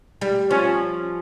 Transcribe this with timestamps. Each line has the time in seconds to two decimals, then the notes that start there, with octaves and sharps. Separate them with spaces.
0.21 G3
0.51 F3 C#4